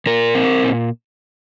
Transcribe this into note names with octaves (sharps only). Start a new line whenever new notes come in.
A#2 A#4
C4
A#2